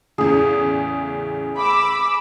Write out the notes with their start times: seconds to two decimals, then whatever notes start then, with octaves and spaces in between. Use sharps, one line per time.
0.18 E2 A2 C#3 G#4
1.56 B5 D6 E6